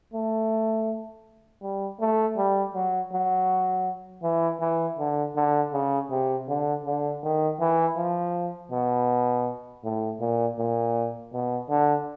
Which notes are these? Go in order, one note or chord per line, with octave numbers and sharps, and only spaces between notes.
A3
G3
A3
G3
F#3
F#3
E3
E3
D3
D3
C#3
C3
D3
D3
D#3
E3
F3
B2
A2
A#2
A#2
B2
D3